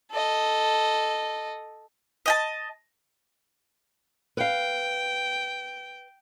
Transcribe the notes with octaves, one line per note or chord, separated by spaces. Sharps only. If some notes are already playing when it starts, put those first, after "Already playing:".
A4 D#5
D#5 G5 A5
B4 F5 G5